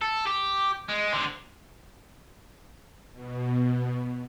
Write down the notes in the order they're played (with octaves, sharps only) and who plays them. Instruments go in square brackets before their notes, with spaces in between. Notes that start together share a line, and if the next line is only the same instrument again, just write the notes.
[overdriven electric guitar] A4
G4
G#3
D3 C4
[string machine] B2